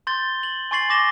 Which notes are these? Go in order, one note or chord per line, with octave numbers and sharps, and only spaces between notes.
C6 G6 A6 G7
F#7
G#5 C6 C#6 A6 C7 F#7
G#5 D6 A#6 E7 G7